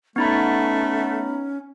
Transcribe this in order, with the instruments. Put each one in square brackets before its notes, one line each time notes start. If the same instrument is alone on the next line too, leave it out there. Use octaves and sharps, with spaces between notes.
[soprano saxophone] A3 [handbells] B3 D#4 B5 [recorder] C#4